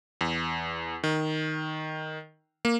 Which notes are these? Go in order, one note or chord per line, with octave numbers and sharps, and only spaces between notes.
E2
D#3
A#3